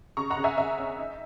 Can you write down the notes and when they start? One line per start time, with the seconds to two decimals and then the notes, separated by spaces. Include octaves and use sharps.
0.17 C#3 A#5 C#6
0.30 F#5 A#5
0.37 C#3
0.44 E5 G#5
0.58 C#3 E5
0.78 C#4
0.99 D#4